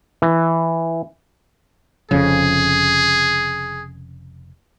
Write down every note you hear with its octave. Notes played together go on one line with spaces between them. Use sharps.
E3
F1 F2 C#3 G#4